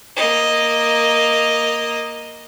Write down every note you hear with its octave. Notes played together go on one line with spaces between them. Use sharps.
A#3 D#5